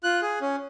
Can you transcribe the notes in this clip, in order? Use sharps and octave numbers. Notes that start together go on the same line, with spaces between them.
F4 F#6
G#4
C#4